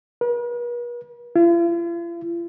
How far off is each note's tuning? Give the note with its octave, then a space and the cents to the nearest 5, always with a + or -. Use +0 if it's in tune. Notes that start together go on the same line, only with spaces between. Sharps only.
B4 -45
F4 -45